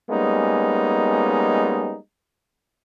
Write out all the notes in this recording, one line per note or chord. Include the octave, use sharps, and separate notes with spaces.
G3 G#3 A#3 B3 C#4 D#4